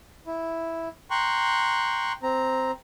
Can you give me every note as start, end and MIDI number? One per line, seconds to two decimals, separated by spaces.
0.27 0.88 64
1.11 2.12 79
1.11 2.12 82
1.11 2.12 84
1.11 2.12 85
1.11 2.12 90
2.23 2.71 60
2.23 2.71 82